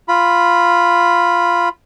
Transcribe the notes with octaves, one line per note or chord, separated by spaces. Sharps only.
F4 B5